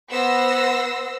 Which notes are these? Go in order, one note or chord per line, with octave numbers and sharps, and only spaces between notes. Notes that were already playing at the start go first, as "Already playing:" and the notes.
B3 C5 F#5 C6 E6 A#6